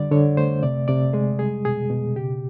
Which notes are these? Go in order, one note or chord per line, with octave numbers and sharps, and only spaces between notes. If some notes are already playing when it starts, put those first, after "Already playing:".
Already playing: D3 G3 D5
D3 C#5
A3 C5
C3 D5
C3 D5
G#3 G#4
G3 G#4
B2 G#4
B2
C#3 G4